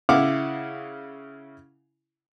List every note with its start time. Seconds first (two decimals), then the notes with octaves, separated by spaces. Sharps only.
0.09 C#3 E4 F5 F#5 D6 F6